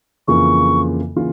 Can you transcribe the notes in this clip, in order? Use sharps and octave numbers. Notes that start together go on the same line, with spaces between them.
F2 C#3 E3 A#3 F4 C#6
C#3 E3 A#3 F4